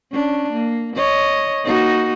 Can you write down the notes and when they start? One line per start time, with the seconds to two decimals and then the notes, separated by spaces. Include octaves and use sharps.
0.12 C#4 D4
0.53 A#3
0.96 C#5 D#5
1.64 A#3 D#4 F#4